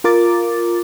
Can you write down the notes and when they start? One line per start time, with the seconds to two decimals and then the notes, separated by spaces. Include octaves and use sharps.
0.04 F4 A#4 D6 A6